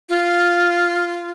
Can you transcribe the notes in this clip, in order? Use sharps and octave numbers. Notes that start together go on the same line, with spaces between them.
F4